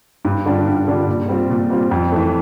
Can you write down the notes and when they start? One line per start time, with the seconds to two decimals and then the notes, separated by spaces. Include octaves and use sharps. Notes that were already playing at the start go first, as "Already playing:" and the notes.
0.25 G2
0.45 D3 G3 D4 F4
0.66 G2
0.87 D3 G3 D4 F4
1.08 A#2
1.29 G3 C4 F4
1.50 A#2
1.70 G3 C4 F4
1.91 F2
2.12 E3 A3